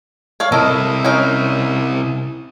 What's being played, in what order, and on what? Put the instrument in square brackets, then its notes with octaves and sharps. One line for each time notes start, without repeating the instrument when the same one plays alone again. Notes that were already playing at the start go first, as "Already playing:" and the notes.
[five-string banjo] C#5 D5 F5
[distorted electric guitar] C3 E4 [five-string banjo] A4 A#4 D#5
[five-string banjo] C#4 D#4 A#4